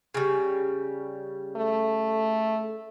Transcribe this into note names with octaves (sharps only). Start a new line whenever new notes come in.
C#3 G3
A3